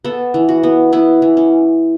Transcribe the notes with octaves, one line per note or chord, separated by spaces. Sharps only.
B3 A4
E3
F#4
B3
B3 E4
E3
C#4